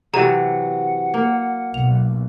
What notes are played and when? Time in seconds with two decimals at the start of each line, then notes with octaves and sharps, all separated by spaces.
0.14 C3 E3 F#3 G4 A4 F#5 A#5
1.14 A#3
1.74 B1 F7